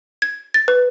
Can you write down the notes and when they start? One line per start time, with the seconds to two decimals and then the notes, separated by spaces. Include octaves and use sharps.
0.22 G#6
0.54 A6
0.68 B4